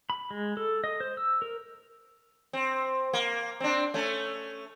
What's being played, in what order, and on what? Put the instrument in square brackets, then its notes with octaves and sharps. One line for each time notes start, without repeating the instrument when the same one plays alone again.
[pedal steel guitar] B5
G#3
A4
D#5
C5
E6
A#4
[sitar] C4
A#3
C4 D4
A3 C#4